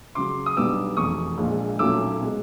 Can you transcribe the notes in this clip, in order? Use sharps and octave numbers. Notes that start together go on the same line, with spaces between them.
C#2 C#3 F#3 C6 D6
D#6
B1 B2 G3 B3 D4 D6 E6
F1 E2 B2 C#6 D#6
A#1 A#2 F3 G#3
B1 A#2 F#3 A3 C#4 D6 E6
B2 G#3